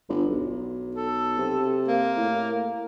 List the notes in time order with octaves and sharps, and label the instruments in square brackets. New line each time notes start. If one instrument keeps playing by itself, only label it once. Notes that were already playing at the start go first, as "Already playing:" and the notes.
[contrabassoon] G1
B1
[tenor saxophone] A4
[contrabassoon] C3
[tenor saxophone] A#3
[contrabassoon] A2